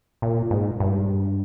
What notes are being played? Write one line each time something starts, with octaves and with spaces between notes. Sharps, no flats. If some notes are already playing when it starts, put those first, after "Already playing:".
A#2
G#2
G2